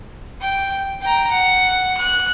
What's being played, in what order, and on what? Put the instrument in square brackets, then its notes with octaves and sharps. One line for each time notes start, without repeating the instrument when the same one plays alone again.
[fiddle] G5
G5 A#5
F#5
F#6